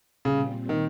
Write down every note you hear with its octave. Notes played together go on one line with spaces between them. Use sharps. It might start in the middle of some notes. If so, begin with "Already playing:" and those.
A#2 C#3 G3 C4
D#3